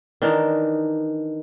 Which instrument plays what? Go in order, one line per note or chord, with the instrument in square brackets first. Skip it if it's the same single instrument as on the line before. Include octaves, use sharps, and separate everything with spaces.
[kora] D#3 E3 D4 D#4